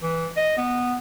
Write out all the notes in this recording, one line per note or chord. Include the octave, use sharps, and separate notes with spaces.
E3
D#5
B3